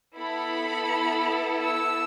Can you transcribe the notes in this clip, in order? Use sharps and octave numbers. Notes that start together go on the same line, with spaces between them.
B3 E4 A4 B5
E6